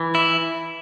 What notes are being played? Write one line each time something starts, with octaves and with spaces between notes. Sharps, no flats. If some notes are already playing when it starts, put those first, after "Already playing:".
Already playing: E3
E4